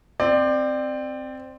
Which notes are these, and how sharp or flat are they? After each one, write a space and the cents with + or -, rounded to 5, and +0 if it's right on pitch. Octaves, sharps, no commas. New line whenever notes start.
C4 +0 D5 +25